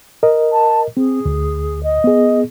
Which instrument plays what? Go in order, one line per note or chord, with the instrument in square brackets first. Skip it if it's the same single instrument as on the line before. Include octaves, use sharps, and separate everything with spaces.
[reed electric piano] A#4 D#5
[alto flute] A5
[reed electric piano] C4 [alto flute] G#4
[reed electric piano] D2
[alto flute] D#5
[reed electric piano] B3 G#4